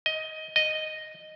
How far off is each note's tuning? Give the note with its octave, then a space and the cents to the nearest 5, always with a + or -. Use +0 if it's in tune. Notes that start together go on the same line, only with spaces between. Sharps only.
D#5 +15
D#5 -5